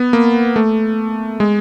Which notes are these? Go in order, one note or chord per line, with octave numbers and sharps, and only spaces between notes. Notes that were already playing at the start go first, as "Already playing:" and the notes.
Already playing: B3
A#3
A3
G#3